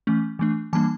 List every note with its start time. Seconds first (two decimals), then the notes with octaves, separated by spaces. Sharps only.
0.07 E3 A3 C#4
0.39 E3 A3 D4
0.73 E3 G3 A#3 D4 A5